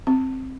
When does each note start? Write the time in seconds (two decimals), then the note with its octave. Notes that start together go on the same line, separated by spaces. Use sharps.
0.07 C4